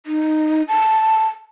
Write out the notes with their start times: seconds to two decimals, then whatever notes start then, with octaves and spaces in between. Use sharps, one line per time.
0.06 D#4
0.68 A5